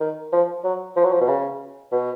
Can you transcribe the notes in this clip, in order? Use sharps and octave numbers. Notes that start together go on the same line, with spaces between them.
D#3
F3
F#3
F3
F#3
F3
B2
C#3
B2